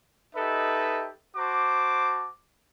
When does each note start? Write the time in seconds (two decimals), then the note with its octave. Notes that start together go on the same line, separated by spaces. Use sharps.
0.36 D#4 G4 A4 B4 D#5 E5
1.36 F#4 C5 A5 D6